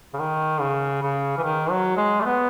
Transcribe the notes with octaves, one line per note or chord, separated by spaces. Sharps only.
C#3
D#3
C#3
C#3
E3
D#3
F#3
G#3
A3
B3